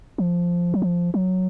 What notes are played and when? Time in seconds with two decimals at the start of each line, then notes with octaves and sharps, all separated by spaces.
0.18 F3
0.74 F#3
0.82 F3
1.14 F#3